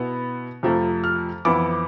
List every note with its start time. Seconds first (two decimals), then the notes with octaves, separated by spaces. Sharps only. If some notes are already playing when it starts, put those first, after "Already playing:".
Already playing: B2 B3 E4
0.63 F2 C3 F3 A3
1.04 F6
1.45 F2 E3 B3 E4 D6